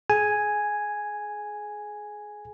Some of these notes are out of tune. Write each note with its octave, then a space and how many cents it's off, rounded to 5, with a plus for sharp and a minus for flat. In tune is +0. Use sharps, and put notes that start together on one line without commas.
G#4 +25 G#5 +0